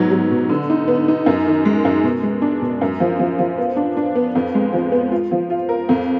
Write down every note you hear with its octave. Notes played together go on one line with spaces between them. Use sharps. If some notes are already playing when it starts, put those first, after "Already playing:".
Already playing: G#2 B2 F#3
F#3
B2
D3
D#4
B3
D#4
F#2
D#3
G#3
F#2
B2
G#3
D4
B2
F#2
F3
F3
F3
B3
D4
D4
B3
F2
G#3
F3
B3
F4
F3
F4
A#4
F2